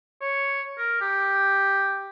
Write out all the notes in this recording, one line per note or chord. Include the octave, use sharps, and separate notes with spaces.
C#5
A#4
G4